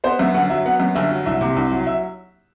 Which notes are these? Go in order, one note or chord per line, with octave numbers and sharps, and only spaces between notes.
B3 C5
F#2 E5
G1 F#5
F#3 E5
B3 F#5
F#2
G1 E5
F#3
C2 E5
C3
C2
F#3
E5